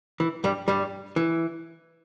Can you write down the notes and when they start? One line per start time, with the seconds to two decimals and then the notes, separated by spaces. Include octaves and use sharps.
0.20 E3
0.44 G2 G3
0.68 G2 G3
1.16 E3